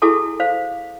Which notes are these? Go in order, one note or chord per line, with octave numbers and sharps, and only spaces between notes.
E4 F#4 G#4 A4 G#5 A5
C5 F5